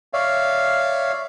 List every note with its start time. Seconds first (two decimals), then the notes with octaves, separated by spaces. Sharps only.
0.13 C#5 D5 E5 F5